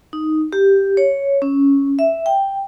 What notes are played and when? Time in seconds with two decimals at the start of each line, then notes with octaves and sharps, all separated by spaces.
0.13 D#4
0.53 G4
0.97 C#5
1.42 C#4
1.99 E5
2.26 G5